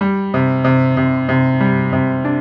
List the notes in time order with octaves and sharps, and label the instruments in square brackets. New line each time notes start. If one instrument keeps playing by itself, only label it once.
[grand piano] G3
C3
C3
C3
C3
G3
C3
D4